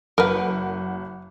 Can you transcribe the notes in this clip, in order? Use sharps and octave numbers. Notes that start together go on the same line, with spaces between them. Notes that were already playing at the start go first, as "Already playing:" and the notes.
F#1 A#4 B4 F#5